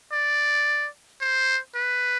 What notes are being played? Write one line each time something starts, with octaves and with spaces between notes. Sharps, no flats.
D5
C5
B4